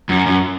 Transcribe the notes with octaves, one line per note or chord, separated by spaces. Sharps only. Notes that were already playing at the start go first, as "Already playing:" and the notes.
F#2
F#2